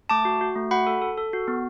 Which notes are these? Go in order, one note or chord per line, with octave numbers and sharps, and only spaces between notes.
A3 A5 D6
F#4
F#4
A3
F#4 F#5 B5
A4
A4
A4
F#4
B3